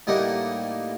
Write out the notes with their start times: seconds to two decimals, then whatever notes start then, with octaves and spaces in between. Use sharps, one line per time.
0.07 A2 G3 A#3 D#4 E4 F#5